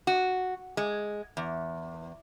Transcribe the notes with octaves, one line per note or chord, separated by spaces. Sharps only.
F#4
G#3
E2